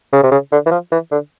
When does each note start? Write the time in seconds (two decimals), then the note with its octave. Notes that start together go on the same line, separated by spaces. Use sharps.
0.13 C#3
0.23 C3
0.31 C#3
0.52 D3
0.66 E3
0.71 F3
0.92 E3
1.12 D3